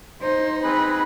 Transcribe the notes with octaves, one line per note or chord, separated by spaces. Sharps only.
D#4 C5
C4 G#4 B4 B5